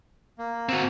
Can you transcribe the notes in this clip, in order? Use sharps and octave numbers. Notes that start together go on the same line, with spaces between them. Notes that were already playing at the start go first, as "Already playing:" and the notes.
A#3
C4 F#4